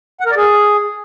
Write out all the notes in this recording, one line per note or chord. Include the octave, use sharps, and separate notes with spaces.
F#5
A#4
D5
G#4